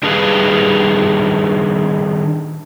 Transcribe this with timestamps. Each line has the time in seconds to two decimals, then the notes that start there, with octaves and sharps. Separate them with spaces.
0.03 D#3 G3 D4 G#4 B4 F5